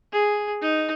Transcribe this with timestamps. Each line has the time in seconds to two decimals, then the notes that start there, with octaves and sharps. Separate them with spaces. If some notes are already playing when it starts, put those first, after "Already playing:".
0.12 G#4
0.61 D#4